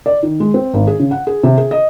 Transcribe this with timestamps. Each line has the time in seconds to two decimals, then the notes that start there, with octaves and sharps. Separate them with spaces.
0.06 D5
0.23 D#3
0.40 G#3
0.54 C4
0.74 G#1
0.87 G#4
1.00 C#3
1.11 F#5
1.27 G#4
1.43 C3
1.58 G#4
1.71 D#5